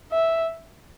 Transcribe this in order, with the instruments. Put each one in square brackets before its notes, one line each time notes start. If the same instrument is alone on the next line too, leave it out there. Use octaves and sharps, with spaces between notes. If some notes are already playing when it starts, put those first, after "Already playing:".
[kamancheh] E5